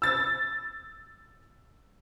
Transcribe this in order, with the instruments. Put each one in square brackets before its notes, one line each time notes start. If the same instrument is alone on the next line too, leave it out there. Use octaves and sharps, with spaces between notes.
[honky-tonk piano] E6 A6